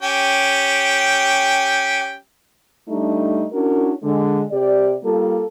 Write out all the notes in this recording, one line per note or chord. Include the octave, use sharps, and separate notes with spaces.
C#4 G4 G5
G3 A3 D4 D#4
C#4 D4 E4 F#4 A#4
D3 G#3
C3 G4 D5
G3 A#3 F4 A4